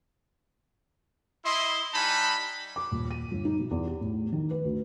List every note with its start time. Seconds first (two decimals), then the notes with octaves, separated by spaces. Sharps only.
1.45 E4 D#5 C6
1.94 G3 D#4 F#5 G#5 A5 B5
2.76 D6
2.91 D#1
3.11 D#7
3.31 G1
3.45 D#4
3.59 B2
3.71 E2
3.87 G4
4.01 A2
4.32 D#3
4.51 B4
4.64 D2